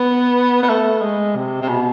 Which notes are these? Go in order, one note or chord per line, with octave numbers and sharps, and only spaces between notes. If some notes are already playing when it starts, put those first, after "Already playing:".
Already playing: B3
B3
A3
G#3
C3
C3
B2